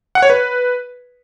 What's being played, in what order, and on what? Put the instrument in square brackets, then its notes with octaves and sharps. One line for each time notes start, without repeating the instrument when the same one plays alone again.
[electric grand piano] F#5
C#5
B4